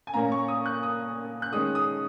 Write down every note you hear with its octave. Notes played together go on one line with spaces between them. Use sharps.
G#5
A#2 A#3 C#4 A#5
C#6
D#6
F#6
D#6
F#6
D#3 G#3 C#4 D#6
D#6